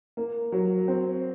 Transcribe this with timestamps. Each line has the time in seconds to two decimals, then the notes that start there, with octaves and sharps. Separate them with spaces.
0.17 A#3
0.52 F#3
0.88 C4